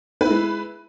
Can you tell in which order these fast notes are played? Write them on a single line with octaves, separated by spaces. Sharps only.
B4 E4 G#3